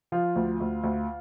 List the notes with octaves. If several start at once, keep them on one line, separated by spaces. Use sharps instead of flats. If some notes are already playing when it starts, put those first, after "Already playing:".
F3 F4
D2
D2
D2